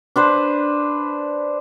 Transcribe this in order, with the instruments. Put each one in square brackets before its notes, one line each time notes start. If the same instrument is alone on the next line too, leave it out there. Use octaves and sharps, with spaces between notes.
[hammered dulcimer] D4 B4 C5